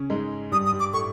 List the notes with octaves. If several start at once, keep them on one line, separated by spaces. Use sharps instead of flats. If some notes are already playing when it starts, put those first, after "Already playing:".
Already playing: C#3 C#4
G#2 G#3
G2 G3 D#6
D#6
G2 G3
D6
A2 A3 C#6